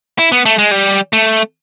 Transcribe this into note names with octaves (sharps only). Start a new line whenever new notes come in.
E4
B3
A3
G#3
G3
A3